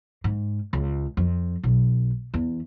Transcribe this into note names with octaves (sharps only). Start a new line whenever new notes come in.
G#2
C#2
F2
B1
E2